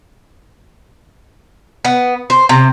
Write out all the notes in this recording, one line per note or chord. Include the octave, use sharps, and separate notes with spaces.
B3
C5
C3